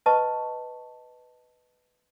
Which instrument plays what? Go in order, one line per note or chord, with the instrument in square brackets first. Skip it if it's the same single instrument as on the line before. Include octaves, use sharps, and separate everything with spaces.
[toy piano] B4 D#5 A5 C#6